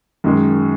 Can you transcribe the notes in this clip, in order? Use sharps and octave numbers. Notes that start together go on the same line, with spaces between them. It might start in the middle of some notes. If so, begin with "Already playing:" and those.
F#2 D#3 G#3